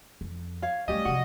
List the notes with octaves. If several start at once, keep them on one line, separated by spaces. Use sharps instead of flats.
F2
C#5 F5
G3 A3 C#4 G4 D5 D#5
C3 F3 F#4